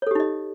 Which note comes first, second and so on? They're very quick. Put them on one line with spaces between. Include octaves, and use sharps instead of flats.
C#5 A4 G4 D#4 D#5